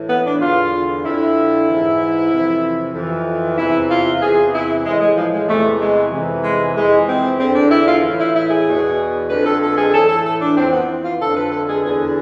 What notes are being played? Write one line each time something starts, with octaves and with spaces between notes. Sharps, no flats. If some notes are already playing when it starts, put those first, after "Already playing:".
Already playing: A2 E3
B3
D4
E2 D3 F4
F2 D3 E4
G#2 E3
F2 C3 E3
F2 E3
E2 C3 E3 E4
F4
E2 C3 E3 G#4
E4
A2 E3 G#3
G#3
F3
G#3
E2 C3 E3 A3
G#3
F2 C3 E3
G#3
F2 E3 G#3
C4
E2 D3 C4
D4
E4
F4
A2 E3
E4
E4
G#4
E2 B2
F2 D3 B4
A4
A4
G#4
A2 E3 A4
A4
A4
D4
F2 E3 C4
B3
F4
F2 D3 A4
B4
A4
G#4
E2 D3 G#4